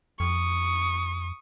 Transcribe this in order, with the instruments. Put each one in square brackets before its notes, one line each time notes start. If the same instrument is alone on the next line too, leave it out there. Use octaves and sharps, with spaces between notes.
[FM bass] F2 [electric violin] C#6 D#6